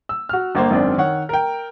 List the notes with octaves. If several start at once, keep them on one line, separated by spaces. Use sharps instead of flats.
E6
F#4 F6
G1 A#3 C5
G#1 F#2 C4 D4
D#3 C#5 F#5
A#4 G5